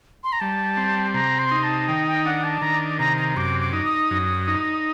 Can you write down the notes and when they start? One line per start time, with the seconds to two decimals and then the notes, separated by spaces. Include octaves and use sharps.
0.24 C6
0.32 A#5
0.40 G3 A5
0.77 C4
1.14 C3 A#5
1.39 C6
1.51 D#4
1.63 A5
1.88 D#3 G5
2.07 G5
2.25 D4 F#5
2.44 A5
2.62 D#3 A#5
2.99 C3 A#5
3.17 A#5
3.36 F#2 D6
3.60 D6
3.73 D#4
3.85 D#6
4.11 F#2
4.48 D#4